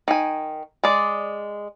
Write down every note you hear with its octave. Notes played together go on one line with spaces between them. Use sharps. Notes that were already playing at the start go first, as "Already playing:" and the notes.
D#3 G#5
G#3 D5